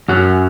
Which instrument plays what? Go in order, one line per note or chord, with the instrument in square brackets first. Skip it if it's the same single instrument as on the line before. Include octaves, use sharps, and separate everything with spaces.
[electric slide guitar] F#2 F#3